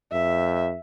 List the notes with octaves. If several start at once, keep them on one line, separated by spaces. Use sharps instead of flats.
F2 E5